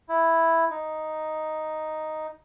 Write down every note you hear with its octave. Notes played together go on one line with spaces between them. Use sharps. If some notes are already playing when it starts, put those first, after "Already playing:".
E4
D#4